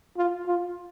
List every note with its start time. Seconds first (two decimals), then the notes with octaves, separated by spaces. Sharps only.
0.17 F4
0.46 F4